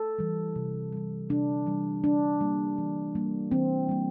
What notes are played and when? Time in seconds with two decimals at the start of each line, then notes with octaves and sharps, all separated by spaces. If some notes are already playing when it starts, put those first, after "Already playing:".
Already playing: A4
0.19 E3 G3
0.56 C3
0.93 E3 G3
1.29 C3 D4
1.66 E3 G3
2.04 E3 D4
2.41 G3 A#3
2.78 E3
3.15 G3 A#3
3.51 E3 C4
3.89 G3 A#3